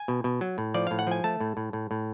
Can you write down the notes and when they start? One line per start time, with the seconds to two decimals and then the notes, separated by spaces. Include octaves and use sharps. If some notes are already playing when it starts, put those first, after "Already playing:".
Already playing: G#5
0.08 B2
0.24 B2
0.41 F#3
0.58 A2
0.74 F3 D5
0.87 A2 F5
0.99 F#5
1.07 F3 G#5
1.24 A3 A5
1.40 A2
1.57 A2
1.73 A2
1.91 A2